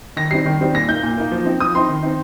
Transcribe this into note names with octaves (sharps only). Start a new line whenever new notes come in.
D#3 A#6
G3 C4 D#4 C7
D#3
G3 C4 D#4
A#2 A#6
A#3 D#4 G6
A#2
A#3 D#4
F3
C4 D#4
F3 D#6
C4 D#4 C6
D#3
C4 D#4